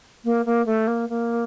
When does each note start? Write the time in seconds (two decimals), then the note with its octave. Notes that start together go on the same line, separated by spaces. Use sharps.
0.24 A#3
0.46 A#3
0.66 A3
0.87 A#3
1.09 A#3